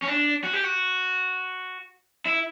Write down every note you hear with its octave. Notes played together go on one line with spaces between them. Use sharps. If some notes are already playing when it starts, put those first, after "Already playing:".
C#4
D4
F#4
G4
F#4
E4